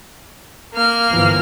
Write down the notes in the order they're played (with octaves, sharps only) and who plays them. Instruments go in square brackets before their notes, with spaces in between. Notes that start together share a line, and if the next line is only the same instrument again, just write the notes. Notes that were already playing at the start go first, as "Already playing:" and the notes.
[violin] A#3 F6
[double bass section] G1 E3 F3